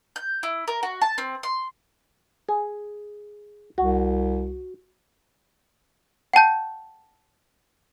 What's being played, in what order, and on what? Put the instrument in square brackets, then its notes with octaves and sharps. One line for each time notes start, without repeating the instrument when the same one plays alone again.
[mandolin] G6
E4
A#4
F#4
A5
C4
C6
[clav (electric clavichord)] G#4
[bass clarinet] C2 [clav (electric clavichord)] F#4
[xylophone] F#5 G5 A5 G6